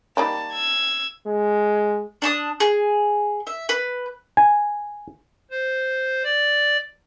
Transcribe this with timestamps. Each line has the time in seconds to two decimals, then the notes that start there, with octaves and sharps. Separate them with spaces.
0.17 D#3 G3 A#3 A5
0.52 E6 G#6
1.26 G#3
2.22 D4 A5 D#6
2.60 G#4
3.47 E5
3.69 B4
4.37 G#5
5.51 C5
6.23 D5